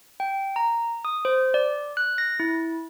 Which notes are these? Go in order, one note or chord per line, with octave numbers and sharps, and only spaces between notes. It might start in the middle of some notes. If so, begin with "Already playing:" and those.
G5
A#5
D#6
C5
D5
F#6
A#6
E4